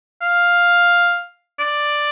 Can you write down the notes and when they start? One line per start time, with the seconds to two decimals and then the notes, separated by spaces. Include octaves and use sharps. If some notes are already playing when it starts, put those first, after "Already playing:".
0.22 F5
1.59 D5